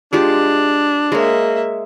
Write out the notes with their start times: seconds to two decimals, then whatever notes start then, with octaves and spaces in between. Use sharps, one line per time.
0.13 G#3 D4 F4 G4
1.12 G#3 A#3 C#5 E5